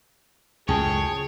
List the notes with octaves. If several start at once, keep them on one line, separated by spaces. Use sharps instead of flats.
C#2 F#2 A2 G#4 C#5 G5 A5